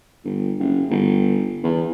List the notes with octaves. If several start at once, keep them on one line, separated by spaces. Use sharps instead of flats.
G1
F#1
G1
E2